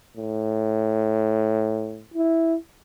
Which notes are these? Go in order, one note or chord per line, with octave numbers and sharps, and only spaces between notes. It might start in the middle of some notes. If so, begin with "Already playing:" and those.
A2
E4